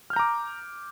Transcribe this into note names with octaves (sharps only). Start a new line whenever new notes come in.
A#5 D6 F6 G6